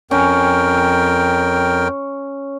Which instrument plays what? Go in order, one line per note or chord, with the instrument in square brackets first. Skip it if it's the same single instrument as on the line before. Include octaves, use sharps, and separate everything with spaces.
[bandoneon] F2 A#4 G5 [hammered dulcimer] C#4